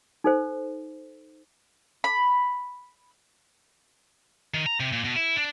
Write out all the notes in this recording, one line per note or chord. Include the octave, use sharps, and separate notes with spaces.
D#4 A4 C5
B5
D#3
A#5
C3
A#2
B2
E4
D4